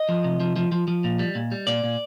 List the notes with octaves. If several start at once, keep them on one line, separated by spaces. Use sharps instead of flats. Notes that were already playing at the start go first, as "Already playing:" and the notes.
Already playing: D#5
F3
C3
F3
F3
F3
F3
A#2
G3
A#2
G3
A#2 D5
A#2